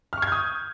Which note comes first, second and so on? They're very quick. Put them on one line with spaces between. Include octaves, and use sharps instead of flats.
F6 C#6 G#6 G6 D#6